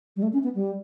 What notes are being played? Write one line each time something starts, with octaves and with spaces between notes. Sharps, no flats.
G3
A3
C#4
B3
G3